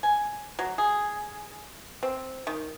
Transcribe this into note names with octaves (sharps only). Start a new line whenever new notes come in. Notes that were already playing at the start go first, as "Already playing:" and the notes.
G#5
F#3
G#4
C4
D#3